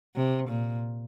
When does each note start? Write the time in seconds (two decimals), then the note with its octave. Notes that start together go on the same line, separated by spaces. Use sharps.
0.16 C3
0.50 A#2